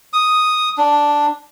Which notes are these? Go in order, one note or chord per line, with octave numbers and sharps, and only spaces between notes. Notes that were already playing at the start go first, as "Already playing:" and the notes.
D#6
D4